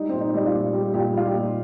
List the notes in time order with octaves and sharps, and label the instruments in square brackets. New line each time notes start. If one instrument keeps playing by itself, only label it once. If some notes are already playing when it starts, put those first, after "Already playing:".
Already playing: [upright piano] G3 D#4
A#2 C4
D#4
G3 D#4
F4
A#2
G3 G4
A#2 G4
F4
G3 F4
G4
A#2